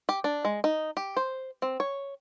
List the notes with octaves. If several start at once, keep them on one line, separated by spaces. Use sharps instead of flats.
G4
D4
G#3
D#4
G4
C5
C4
C#5